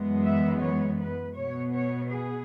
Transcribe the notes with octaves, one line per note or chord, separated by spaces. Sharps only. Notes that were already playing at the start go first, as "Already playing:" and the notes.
Already playing: F#2 E3 G#3 B3
E5
C#5
B4
B2 B3 C#5
C#5
G#4